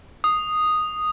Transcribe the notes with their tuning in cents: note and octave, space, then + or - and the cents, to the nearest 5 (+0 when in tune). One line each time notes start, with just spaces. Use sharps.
D#6 -5